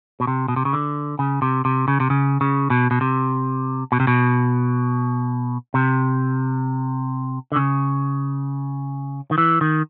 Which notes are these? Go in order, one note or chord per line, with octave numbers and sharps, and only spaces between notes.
B2
C3
B2
C3
C#3
D3
C#3
C3
C3
C#3
C3
C#3
C#3
B2
B2
C3
B2
C3
B2
C3
D3
C#3
D#3
E3
D#3